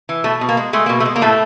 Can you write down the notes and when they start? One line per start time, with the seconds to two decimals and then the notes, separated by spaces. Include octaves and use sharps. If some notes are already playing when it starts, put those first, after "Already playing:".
0.09 E3
0.24 B2 A3
0.41 B2
0.49 A#3
0.57 G#3
0.73 G#3 A3
0.86 B2 A#3
1.00 A3
1.05 G#3
1.16 A#3
1.21 A2 A3